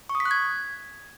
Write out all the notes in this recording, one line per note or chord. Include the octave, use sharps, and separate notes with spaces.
C#6
D#6
B6
F#6
G#6